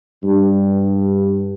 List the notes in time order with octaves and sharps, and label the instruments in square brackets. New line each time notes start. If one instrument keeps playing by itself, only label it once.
[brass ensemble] G2